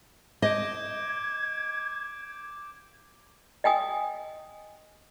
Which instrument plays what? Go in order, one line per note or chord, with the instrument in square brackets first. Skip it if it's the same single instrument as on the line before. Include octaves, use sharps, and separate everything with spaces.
[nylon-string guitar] D#5 [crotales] D6 G6 D7 [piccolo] G#6
[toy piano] D#5 G5 G#5 D#6